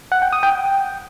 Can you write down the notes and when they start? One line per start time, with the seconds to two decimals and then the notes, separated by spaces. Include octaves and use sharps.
0.12 F#5
0.22 G5
0.33 D#6
0.43 G5